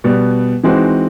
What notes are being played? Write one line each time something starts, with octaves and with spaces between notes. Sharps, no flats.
B2 G3 B3
E3 G#3 C4 D#4 F#4